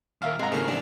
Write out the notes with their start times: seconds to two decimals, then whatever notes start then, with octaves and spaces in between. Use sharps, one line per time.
0.22 D#2 A#2 A#4 E5 F5
0.39 G#2 C3 G#3 F5 F#5 A#5
0.52 D#2 A2 C#3 F#3 G#4 A#4
0.68 E3 G3 D4